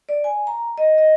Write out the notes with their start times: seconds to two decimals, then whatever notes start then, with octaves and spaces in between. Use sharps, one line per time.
0.09 D5
0.24 G#5
0.47 A#5
0.78 D#5
0.98 D#5